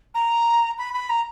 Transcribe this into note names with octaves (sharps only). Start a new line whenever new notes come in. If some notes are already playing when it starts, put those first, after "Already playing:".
A#5
B5
B5
A#5